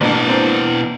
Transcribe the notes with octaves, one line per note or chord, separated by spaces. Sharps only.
A1 B2 E3 A#3 D4
A#3 C4 D4